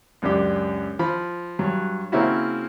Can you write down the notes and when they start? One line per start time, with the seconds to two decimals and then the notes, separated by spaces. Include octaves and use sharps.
0.22 C#2 F#2 D4 G4
0.99 F3 B5
1.59 G2 F#3
2.12 C#3 A#3 C4 C#4 E4 F#4